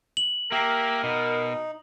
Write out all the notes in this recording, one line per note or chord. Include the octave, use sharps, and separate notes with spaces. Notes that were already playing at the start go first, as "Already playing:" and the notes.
F#7
A#3 G4 A#4 E5
B2 D#4